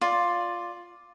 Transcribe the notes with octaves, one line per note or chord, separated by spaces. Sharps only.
F4 D5